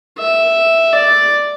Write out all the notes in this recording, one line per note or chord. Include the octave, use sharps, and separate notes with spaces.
E5
D5